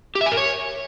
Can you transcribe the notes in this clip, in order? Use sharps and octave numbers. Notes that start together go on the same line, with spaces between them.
G4
E5
G#5
A#4
C#5